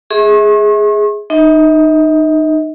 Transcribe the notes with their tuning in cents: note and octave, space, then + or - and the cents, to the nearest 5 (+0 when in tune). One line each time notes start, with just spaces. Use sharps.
G#4 +0 E5 -35 C#6 -40
D#4 -25 D#5 +45